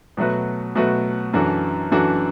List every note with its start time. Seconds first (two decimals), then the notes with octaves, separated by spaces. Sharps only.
0.17 B2 F#3 A3 F#4 B4
0.75 B2 F#3 A3 F#4 B4
1.33 F#2 E3 D4 F#4 A4
1.92 F#2 E3 D4 F#4 A4